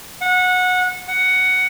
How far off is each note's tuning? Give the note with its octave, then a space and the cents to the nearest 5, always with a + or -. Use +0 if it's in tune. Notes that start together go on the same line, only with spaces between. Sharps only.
F#5 -20
F#5 +10